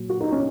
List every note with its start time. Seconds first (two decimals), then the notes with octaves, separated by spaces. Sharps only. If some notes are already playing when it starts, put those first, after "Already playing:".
Already playing: A#2 F#3
0.09 F#4
0.21 D#4
0.31 C#4